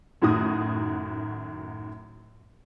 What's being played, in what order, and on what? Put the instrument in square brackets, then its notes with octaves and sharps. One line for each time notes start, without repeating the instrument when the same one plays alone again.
[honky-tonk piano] F#2 A2 D#3 F#4 D#6